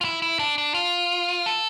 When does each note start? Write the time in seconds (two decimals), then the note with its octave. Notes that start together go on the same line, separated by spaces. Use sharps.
0.01 F4
0.04 E4
0.22 E4
0.39 D4
0.58 D4
0.74 F4
1.46 A4